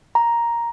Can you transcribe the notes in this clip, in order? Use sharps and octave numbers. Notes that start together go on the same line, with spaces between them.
A#5